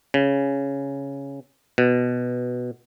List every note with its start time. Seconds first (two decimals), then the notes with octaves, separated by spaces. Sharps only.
0.14 C#3
1.78 B2